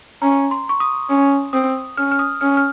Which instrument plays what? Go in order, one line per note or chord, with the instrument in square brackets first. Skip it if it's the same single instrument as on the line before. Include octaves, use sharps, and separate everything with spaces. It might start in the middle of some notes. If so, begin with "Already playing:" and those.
[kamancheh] C#4 [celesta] A#5
[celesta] C6
C#6
D#6
[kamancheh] C#4
[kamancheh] C4 [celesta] D#6
[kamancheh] C#4 [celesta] F6
[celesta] F6
D#6
[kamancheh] C#4 [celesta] F6
[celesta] F6